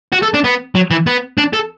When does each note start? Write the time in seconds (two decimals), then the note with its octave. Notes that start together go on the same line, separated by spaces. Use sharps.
0.12 F#4
0.22 A4
0.34 D4
0.44 B3
0.75 F#3
0.91 E3
1.07 B3
1.38 D4
1.53 A4